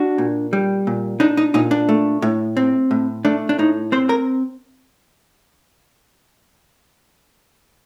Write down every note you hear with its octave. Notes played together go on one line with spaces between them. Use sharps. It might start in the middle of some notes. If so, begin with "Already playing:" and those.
Already playing: D4 F#4
A#2
G3
A#2
D4 D#4
D#4
A#2 D#4
D4
A3
A2
C4
A2
A3 D4
D4
A2 D#4
C4 C5
A#4